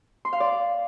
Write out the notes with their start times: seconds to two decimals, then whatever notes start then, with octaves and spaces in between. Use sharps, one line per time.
0.25 C6
0.33 F5
0.40 D5